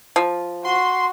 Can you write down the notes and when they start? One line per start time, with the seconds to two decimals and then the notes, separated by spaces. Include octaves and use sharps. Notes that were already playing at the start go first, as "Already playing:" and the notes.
0.16 F3
0.65 F#4 C6